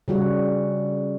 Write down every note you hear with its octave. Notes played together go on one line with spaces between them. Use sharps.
C#3 G3 F#4